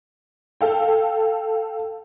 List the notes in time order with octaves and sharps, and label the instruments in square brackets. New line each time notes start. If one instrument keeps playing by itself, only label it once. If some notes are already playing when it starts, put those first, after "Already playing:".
[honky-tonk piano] A4 F5 G5